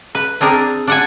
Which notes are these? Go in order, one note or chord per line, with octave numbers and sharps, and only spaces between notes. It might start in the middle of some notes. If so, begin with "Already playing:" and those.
B4
C4 D4 G#4 A#4
D4 F#5 G#5